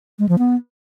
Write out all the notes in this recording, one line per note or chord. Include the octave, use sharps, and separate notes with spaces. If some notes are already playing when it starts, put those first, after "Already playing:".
G#3
F3
B3